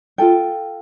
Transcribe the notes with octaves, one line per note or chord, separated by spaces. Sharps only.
F4 A4 G5